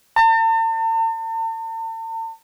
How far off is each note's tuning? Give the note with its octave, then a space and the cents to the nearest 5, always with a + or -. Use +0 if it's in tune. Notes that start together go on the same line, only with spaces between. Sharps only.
A5 +45